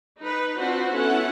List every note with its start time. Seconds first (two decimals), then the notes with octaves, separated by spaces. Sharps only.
0.20 D#4 B4
0.57 C4 D4 F4 F#4 B4 C5
0.91 B3 C#4 E4 A4 F#5